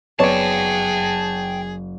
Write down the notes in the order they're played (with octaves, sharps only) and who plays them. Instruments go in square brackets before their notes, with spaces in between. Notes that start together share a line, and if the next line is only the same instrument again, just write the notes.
[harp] F#1 [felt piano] B3 C#5 D5 [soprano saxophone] G#4 [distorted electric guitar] G5 A5